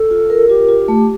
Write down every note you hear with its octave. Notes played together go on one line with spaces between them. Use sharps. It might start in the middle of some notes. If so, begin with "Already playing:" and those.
Already playing: A4
F4
A#4
F4 G4
F4
A3